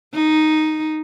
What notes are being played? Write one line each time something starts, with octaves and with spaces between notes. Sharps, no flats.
D#4